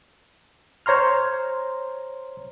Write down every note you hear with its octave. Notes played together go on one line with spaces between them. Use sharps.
C5 C#5 A#5 C6 F6